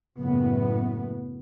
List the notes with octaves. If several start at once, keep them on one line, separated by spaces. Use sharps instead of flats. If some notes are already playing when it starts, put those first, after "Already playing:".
F#1 A2 B3